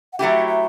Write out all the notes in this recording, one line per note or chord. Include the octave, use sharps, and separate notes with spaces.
F#5
F#3 A3 E4 G4 E5
E5